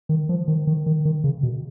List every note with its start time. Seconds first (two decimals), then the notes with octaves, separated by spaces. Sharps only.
0.09 D#3
0.29 F3
0.48 D#3
0.67 D#3
0.86 D#3
1.05 D#3
1.24 C#3
1.43 B2